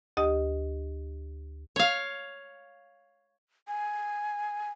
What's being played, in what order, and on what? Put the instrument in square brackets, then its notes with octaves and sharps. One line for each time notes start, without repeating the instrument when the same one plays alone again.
[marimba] D2 G4 D#5 D#6
[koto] C#5 F5
[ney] G#5